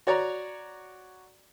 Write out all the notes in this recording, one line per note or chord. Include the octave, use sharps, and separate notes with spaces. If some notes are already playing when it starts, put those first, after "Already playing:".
F#4 C#5 D5 A#5